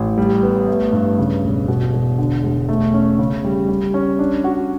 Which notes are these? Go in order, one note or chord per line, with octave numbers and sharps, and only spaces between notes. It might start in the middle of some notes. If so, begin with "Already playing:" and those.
Already playing: A1
G3
B3
A3
G2
C#3
E1
B2
E1
D3
E1
A3
C#4
C#3
G3
G3
C#4
D4
F#4